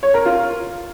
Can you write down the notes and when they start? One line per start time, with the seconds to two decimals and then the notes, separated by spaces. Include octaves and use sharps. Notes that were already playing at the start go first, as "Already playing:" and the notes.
0.03 C#5
0.14 A#4
0.25 F4